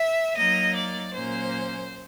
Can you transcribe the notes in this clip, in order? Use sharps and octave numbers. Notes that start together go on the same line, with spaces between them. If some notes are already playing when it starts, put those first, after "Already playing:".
Already playing: E5
F#3 A#3 D#4 D#5
D5
A#2 F#3 A#3 C#4 C5